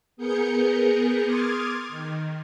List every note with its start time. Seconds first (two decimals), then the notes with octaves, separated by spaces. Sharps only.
0.17 B3 G#4 A#4 G6 C#7
1.24 C6 D6 D#6 F6 G#6 A6
1.89 D#3